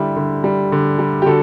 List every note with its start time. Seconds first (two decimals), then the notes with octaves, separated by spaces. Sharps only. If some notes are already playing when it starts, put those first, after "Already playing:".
Already playing: D3 G3 E4 G4
0.16 D3
0.44 G3
0.72 D3
0.99 G3
1.22 G4
1.26 D3 F#4 A4